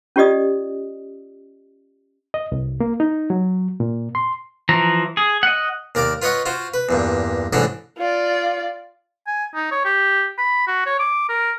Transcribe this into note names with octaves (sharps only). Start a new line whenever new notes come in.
C#4 F4 G4 D5 D#5 D#6
D#5
C2
A#3
D#4
F#3
A#2
C6
E3 F3 A#5
G#4
D#5 F#5
D#2 A#4 D5 F5 D6
F4 B4 C#5 D#5 F#5
F4 F#4 C5
B4
E2 G2 A#2
A1 G#2 D3 E3 D4 A4
F4 D5
G#5
D#4
C#5
G4
B5
F#4
C#5
D6
A#4